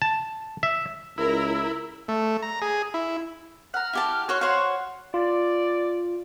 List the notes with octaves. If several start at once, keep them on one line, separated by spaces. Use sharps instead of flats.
A5
E5
C#2 E4 A#4
A3
A#5
G#4
E4
F#5 A#5 F6
E4 G4 A5
F#4 C#5 C6 F#6
F#4 C5 C#5 F5 F#5 C6
F4 D5